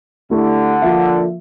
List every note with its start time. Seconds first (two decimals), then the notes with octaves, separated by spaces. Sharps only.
0.30 D3 A3 E4 G4
0.82 F3 A#3 F4 A#4 E5